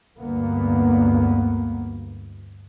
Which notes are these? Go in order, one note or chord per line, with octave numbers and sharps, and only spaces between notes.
D2 G2 A#3 B3